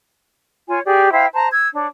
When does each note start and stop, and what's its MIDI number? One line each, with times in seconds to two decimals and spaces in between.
0.69 0.80 65
0.69 0.80 73
0.69 0.80 80
0.85 1.12 67
0.85 1.12 68
0.85 1.12 74
1.12 1.26 64
1.12 1.26 72
1.12 1.26 77
1.12 1.26 79
1.33 1.48 72
1.33 1.48 81
1.33 1.48 82
1.52 1.68 88
1.52 1.68 92
1.73 1.86 62
1.73 1.86 73